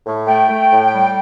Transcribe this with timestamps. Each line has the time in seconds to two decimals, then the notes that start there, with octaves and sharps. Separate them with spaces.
0.06 A2
0.27 A3 G5
0.49 A3
0.70 A2
0.93 G3